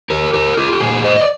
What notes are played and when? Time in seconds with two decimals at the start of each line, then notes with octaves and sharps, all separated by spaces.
0.10 G4 A#4
0.33 G4 A#4
0.57 F4 G#4
0.72 G4
0.80 A#2 G3 G#4
1.04 C5 D#5
1.20 D5